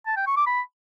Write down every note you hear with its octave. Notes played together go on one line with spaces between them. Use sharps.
A5
G5
C#6
D6
B5